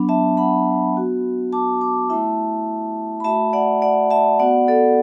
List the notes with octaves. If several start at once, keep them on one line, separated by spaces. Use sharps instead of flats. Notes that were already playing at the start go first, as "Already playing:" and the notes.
Already playing: F#3 B3 D4
E5 A5
F#5 B5
B3 F#4
A5 D6
A5 D6
A3 E4 E5 A5
B5
A3 F#4 E5 A5
D5 F#5
D5 F#5
E5 A5
B3 F#4 D5 F#5
A4 D5